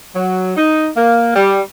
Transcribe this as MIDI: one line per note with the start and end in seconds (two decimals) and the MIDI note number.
0.15 0.54 54
0.57 0.89 63
0.96 1.35 58
1.36 1.61 55